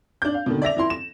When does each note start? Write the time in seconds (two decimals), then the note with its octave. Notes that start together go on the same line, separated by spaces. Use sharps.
0.22 D4 G6
0.34 F5
0.46 B2 D3 D#3
0.62 D5 E5 A#6 F7
0.77 E3 E4 C6
0.90 E7